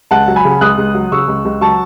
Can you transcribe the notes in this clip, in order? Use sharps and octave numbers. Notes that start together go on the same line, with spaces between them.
C#2 F#5 A5
F#3
G#5 B5
C#3
C#2 D#6 F#6
C#2
F#3
C#3 C#6 E6
C#2
C#2
F#3 A5 C#6